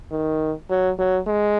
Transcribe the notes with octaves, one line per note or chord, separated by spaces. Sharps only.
D#3
F#3
F#3
G#3